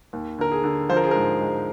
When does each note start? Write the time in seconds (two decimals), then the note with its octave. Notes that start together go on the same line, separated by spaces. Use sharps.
0.13 D#2
0.38 D3 A#4
0.52 G#4
0.64 D3
0.89 F3 C5
0.96 A#4
1.04 G#4
1.11 G#2 A#4
1.41 G#3